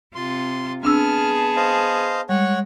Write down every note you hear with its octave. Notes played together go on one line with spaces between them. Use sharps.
C3 F4 C6
B3 C4 D4 G#4 A5 E6 F6
C5 D#5 F5
G3 G#3 C#5 F#5